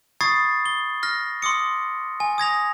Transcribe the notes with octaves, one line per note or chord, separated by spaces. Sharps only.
B5 C#6 D#6 G#6 A6 C7
G7
F6 A#6
C6 D6 D#6 C#7
G#5
D#6 G#6 A#6 F7